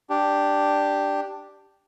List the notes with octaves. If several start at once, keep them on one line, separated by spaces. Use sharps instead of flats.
D4 G4